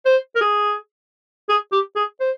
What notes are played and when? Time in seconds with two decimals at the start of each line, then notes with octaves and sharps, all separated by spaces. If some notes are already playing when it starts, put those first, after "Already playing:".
0.05 C5
0.35 A#4
0.41 G#4
1.49 G#4
1.72 G4
1.96 G#4
2.20 C5